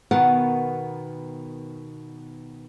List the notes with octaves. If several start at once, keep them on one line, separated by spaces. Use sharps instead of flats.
B2 D#3 B3 A#4 F#5